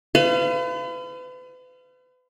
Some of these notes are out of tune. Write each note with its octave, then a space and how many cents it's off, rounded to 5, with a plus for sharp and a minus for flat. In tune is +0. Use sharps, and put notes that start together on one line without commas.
B4 +40 F5 -30